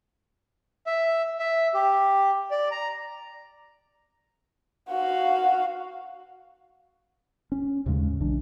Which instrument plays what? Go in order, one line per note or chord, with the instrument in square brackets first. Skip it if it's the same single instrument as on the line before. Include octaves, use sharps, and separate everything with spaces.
[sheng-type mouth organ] E5
E5
G4
D5
A#5
[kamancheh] F#4 F5
[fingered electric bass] C#4
D#2 G#2 C#3 G#3
B1 E3 D4